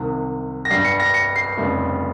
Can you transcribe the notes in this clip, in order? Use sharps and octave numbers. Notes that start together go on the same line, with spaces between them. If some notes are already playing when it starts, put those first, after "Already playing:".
Already playing: C2 C3 D#3
A#6
G1 G2 G3 C7
C#7
A#6
C#7
C7
F1 F2 C#3 G3